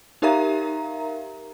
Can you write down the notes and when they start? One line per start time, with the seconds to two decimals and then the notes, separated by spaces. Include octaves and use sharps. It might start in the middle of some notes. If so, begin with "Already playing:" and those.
0.22 D#4 G4 A#4 E5 F5 A#5